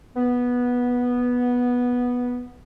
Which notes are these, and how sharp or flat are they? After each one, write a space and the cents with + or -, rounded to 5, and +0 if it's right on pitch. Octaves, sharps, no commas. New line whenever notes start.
B3 -10